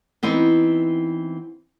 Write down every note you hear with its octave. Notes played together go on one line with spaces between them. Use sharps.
E3 B3 C4 D#4